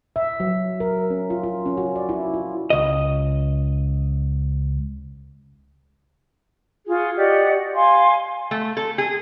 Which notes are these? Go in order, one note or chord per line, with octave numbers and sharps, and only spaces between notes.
E5
F#3
A#4
C#4
F4
F4
C#4
F#4
D5
E4
F4
C#2 D#5
F4 F#4 G#4
F#4 G4 D5 D#5
F5 G#5 C6
A3
A4
G#4